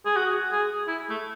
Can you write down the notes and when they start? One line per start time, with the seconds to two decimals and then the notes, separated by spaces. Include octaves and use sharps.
0.06 G#4
0.16 F#4
0.52 G#4
0.88 E4
1.10 A3